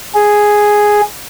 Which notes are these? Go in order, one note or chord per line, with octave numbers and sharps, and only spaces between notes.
G#4